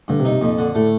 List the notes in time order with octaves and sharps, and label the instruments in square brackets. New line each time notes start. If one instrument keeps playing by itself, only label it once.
[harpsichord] G2 [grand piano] D3
[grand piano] C3
[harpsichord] D#4
[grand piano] C3
[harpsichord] F2 [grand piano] A#2
[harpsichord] D3
[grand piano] A2 [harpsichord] A3